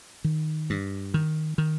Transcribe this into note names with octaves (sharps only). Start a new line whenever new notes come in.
D#3
G2
D#3
D#3